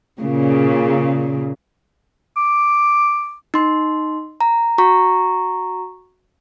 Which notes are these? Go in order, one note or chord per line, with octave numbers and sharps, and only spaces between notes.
A#2 C#3
D6
D#4 C6
A#5
F#4 A#5 C#6